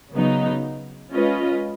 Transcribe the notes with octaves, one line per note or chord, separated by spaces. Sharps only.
C#3 F#3 B3 D#4
G#3 C#4 F4 B4 D#5